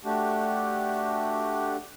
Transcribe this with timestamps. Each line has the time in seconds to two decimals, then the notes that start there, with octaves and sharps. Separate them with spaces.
0.05 A3 D4 F#4 G4